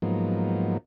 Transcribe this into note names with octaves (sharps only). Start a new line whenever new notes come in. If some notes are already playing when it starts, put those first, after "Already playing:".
G#2 F3 F#3 A#3 B3 D#4